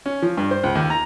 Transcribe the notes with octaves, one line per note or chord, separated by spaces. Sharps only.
C#4
F3
G2
C5
C#2
D#2
A#5